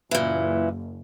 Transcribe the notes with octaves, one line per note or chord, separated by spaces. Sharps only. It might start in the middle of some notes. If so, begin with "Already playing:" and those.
F#1 A#2 E3